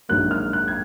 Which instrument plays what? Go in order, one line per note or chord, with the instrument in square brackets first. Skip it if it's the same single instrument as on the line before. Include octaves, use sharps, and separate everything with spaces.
[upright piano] A#1 G#2 D#3 F#3 A#3 F#6
F6
F#6
G#6